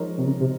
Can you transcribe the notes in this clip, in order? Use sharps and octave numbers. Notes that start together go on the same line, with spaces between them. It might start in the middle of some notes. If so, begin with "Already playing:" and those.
Already playing: F3 G#3 D#4 A#4 C#5
C3
C#3
C3